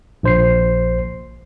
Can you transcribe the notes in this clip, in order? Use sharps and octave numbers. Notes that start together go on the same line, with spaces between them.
A#1 C5 C7